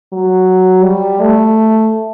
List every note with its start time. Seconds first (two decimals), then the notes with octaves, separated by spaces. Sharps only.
0.13 F#3
0.84 G3
1.20 A3